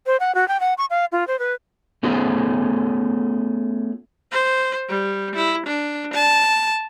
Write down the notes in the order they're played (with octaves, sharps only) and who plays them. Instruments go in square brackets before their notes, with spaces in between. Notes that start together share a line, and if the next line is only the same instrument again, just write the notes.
[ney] C5
F#5
F#4
G5
F#5
C#6
F5
F4
C5
B4
[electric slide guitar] A3 B3 C#4 F4 G#4
[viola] C5
G3
E4
D4
A5